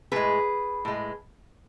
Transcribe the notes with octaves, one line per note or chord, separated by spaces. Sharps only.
A2 G#3 G#4 B4
A2 G#3